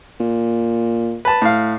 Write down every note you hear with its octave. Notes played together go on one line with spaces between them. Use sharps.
A#2
B4 A5
A2 F5